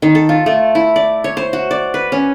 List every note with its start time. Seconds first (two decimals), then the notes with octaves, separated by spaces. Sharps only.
0.02 D#3
0.15 A4
0.29 F4
0.46 A3
0.75 E4
0.96 D5
1.24 C#5
1.37 C5
1.53 F#4
1.71 D5
1.94 B4
2.12 C#4